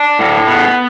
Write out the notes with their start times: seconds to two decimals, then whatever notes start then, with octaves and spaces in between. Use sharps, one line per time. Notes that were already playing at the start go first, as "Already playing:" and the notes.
Already playing: D4
0.19 A2
0.47 B3